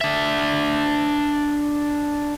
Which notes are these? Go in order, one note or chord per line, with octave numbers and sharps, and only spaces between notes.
D4 E5